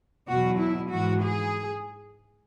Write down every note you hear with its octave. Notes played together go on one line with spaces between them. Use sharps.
E2 B2 F#3 F#4
E4
G#2 E3 F#4
G#4